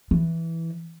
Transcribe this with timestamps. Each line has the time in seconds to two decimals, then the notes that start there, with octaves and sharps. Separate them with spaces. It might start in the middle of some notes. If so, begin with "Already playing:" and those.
0.11 E3